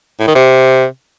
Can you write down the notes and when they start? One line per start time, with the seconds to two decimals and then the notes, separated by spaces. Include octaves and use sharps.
0.20 A2
0.27 D#3
0.35 C3